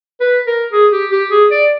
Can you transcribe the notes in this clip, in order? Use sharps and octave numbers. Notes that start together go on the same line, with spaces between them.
B4
A#4
G#4
G4
G4
G#4
D5